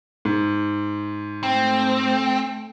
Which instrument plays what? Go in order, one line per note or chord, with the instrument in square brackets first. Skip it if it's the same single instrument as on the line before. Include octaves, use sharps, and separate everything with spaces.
[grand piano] G#2
[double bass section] A3 [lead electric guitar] C4